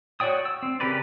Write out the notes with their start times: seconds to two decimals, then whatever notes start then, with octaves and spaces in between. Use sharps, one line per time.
0.20 F#4 C#5 D5 G5 D#6
0.45 E6
0.63 C4
0.80 C#3 G4 A#4 B4 D5